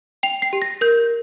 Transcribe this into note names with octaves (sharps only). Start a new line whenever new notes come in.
G5 F7
C7
G4
A#6
A#4 G6